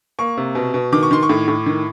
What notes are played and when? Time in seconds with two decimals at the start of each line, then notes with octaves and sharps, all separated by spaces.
0.19 A#3 C#6
0.37 C3
0.55 B2
0.74 B2
0.92 D#3 D6
1.03 C#6
1.11 D#3 C6
1.23 C#6
1.29 A2
1.48 A2
1.66 D#3